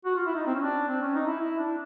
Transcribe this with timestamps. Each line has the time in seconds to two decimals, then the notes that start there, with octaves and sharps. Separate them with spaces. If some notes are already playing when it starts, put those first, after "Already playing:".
0.05 F#4
0.16 F4
0.26 E4
0.36 D#4
0.46 C4
0.54 C#4
0.62 D4
0.88 C4
1.02 C#4
1.14 D#4
1.27 E4
1.40 E4
1.57 D4